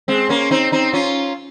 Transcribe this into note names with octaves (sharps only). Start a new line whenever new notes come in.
G#3 C4
A#3 C#4
C4 D#4
C4 D#4
C#4 F4